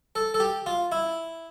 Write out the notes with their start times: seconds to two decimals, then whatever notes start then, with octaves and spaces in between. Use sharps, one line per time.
0.15 A4
0.34 A4
0.40 G4
0.66 F4
0.92 E4